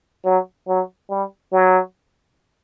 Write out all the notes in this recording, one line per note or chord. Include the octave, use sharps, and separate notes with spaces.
F#3
F#3
G3
F#3